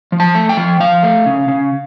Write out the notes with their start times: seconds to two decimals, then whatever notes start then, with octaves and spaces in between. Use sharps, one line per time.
0.12 F3
0.20 A5
0.35 A3
0.49 G5
0.57 F3
0.80 F3 F5
1.03 A3
1.26 C#3
1.48 C#3